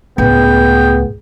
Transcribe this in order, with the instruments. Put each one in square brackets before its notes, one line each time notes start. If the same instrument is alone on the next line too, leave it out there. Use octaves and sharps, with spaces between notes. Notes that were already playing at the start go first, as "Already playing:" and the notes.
[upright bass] C#2 A2 [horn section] B3 [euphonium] G#4 [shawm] G5